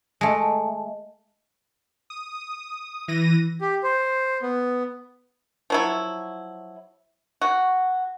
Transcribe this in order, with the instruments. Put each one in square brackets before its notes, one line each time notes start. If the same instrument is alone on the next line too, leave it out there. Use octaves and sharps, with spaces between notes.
[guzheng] G#3 A3
[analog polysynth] D#6
E3 A#6 D#7
[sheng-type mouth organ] G4
C5
B3
[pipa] F3 F#3 E4
F#4